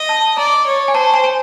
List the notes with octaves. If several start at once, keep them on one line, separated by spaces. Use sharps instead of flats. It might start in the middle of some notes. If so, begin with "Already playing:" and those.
Already playing: D#5
A5
D5 A#5
C#5
G#5
C5 A5
G#5
G#5